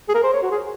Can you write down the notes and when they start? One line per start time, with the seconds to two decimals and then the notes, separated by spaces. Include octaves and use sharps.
0.08 G#4
0.14 A#4
0.23 C5
0.33 C#5
0.42 F#4
0.51 G#4